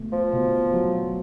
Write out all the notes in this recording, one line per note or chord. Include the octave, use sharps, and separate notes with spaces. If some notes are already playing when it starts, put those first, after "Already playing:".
Already playing: B2 A3
F3
B2
F#3